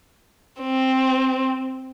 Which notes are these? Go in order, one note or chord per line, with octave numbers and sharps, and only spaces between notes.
C4